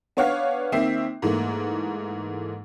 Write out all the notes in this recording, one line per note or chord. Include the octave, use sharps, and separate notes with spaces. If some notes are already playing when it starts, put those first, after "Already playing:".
B3 D4 C#5 F5 F#5
D#3 A#3 C4 E5 C7
G#2 E3 A3 A#3